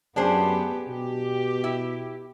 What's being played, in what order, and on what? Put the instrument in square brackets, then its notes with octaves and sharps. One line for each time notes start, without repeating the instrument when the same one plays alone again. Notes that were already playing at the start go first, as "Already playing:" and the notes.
[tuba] F#2 [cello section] B3 G4 [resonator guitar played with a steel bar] D4 G#4 C5
[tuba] B2 [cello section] G4
[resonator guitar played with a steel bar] E4